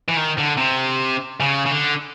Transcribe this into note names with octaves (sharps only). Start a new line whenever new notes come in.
E3
D#3
D3
C3
C#3
C#3
D3